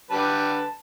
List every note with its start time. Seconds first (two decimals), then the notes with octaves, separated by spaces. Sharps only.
0.10 D3 G3 B4 A5